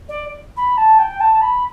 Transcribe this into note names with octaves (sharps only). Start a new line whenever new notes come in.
D5
B5
A5
G5
A5
B5